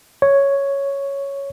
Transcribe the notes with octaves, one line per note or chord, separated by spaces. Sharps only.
C#5